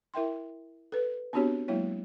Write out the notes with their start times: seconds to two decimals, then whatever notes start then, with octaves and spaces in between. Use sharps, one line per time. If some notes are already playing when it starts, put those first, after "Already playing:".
0.14 E4 A#4 E5 G5 C6
0.92 A4 B4
1.33 B3 C4 D4 F#4 G4 C#5
1.68 F#3 G#3 A#3 E4 C#5